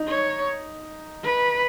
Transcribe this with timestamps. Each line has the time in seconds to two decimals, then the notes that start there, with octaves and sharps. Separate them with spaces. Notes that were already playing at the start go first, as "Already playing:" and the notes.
Already playing: D#4
0.08 C#5
1.24 B4